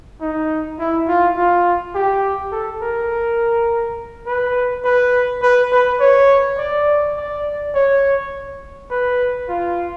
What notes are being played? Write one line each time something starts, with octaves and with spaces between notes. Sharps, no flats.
D#4
E4
F4
F4
G4
A4
A#4
B4
B4
B4
B4
C#5
D5
D5
C#5
B4
F4